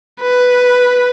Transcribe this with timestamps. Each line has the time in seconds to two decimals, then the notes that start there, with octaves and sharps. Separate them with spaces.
0.21 B4